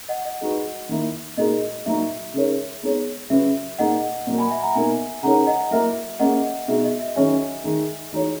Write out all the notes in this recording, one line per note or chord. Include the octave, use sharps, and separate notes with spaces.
D#5 F#5
D#5
G#3 D#4 F#4 B4
D#3 A#3 E4
A#2 G#3 D#4 F#4 A#4 D#5
A#2 F#3 A#3 D#4 F#4 E5
C#3 G#3 D#4 A#4 C#5
G#3 B3 D#4 G#4 C#5
C#3 F#3 C#4 F#4 B4 E5
A#2 A#3 D#4 G#4 D#5 F#5
A#2 F#3 A#3
G#5 B5
E5 G#5
F#5 A#5
B2 A#3 D#4 A#4 E5 G#5
C#3 G#3 D#4 A#4 C#5 F#5 A#5
D#5 F#5
F#3 A#3 E4 A#4 E5
A#3 C#4 G#4 D#5 F#5
B2 G#3 D#4 F#4 E5
D#5
E5
D#3 F#3 C#4 G#4 C#5 E5 G#5
D#3 G#3 D#4
E3 G#3 D#4 F#4 C#5